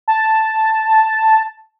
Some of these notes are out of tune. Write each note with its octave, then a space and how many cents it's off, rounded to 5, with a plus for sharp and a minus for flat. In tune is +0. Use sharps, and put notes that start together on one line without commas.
A5 +0